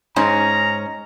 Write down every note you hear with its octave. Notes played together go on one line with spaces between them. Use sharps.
G#2 C#4 A#5